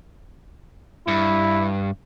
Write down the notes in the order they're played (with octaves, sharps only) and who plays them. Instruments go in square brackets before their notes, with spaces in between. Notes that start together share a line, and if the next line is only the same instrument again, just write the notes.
[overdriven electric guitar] G2 [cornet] E4